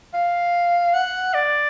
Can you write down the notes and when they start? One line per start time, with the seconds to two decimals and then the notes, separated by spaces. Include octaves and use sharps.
0.14 F5
0.94 F#5
1.34 D5